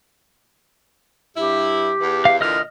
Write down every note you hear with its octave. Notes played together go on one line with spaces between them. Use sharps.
G2 E4 G4
E2 E3
F5
A#2 D3 E3 D#5 F6